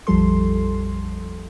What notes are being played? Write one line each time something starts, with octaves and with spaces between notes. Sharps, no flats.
A#1 F2 F3 G3 A4 C6